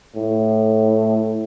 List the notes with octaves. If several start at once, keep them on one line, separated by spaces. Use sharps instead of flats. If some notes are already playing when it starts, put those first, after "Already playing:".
A2